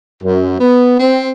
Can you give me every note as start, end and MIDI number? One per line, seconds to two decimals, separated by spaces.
0.23 0.55 42
0.60 0.99 59
1.00 1.30 60